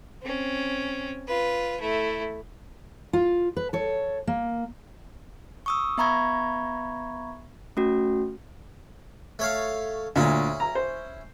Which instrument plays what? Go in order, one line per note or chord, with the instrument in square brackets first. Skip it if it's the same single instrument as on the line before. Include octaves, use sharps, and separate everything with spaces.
[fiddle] C4 C#4
F4 B4
A3 E4
[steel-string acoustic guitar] F4
B4
A4 C#5
A#3
[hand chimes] C#6 D#6 E6
B3 E5 A#5 B5 C#6 G#6
A3 C#4 F#4
[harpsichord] A3 C#5 F5
[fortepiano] D2 A#2 [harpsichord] C#4 E4
[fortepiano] A#5
C5